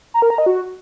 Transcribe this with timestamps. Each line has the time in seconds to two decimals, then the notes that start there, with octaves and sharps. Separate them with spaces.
0.14 A#5
0.22 A#4
0.30 A#5
0.38 D#5
0.46 F#4